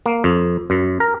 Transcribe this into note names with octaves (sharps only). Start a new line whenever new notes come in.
A#3
F2
F#2
A#4